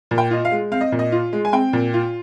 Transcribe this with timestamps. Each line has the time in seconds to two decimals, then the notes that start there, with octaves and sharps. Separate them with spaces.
0.11 A#2
0.18 G5
0.31 F4 D#5
0.45 F5
0.51 G#3
0.72 C4 F5
0.81 D#5
0.92 A#2
0.99 D#5
1.12 F4
1.33 G#3
1.45 G#5
1.53 C4 G5
1.73 A#2
1.94 F4